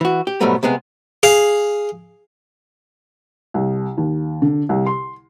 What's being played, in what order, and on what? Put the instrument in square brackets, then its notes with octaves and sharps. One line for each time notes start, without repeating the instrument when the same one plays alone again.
[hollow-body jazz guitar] E3 F#4
G4
G#2 B2 F#3 G3 A3 B3
C3 G#3 B3 G#4
[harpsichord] G#4 F5
[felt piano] C2
D#2
D3
C2
C6